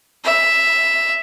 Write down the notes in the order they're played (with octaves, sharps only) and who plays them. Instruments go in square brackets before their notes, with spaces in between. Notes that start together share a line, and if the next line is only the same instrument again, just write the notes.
[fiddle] E5